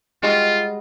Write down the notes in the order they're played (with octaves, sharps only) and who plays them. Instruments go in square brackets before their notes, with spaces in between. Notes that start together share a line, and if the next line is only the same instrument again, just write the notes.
[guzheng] G3 G#3 F#4 [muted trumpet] F4